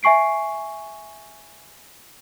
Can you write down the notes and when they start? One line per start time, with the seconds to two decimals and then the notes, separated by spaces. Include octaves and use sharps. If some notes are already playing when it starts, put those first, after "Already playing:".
0.03 E5 G#5 C#6 C7 D7